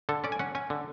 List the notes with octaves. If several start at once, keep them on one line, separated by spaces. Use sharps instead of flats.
D3 A4
C#4 D5
G#5
C#4 F#5
C#4 G#5
D3